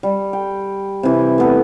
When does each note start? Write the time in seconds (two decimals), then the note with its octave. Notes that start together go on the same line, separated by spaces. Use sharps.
0.03 G3
0.33 G5
1.03 C3 E3
1.38 A3 B3 A4